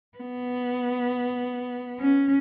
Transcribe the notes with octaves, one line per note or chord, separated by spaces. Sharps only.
B3
C#4